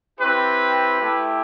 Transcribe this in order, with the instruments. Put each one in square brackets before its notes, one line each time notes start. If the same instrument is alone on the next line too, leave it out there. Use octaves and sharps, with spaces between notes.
[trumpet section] C4 E4 G4 B4
A3 E4 G4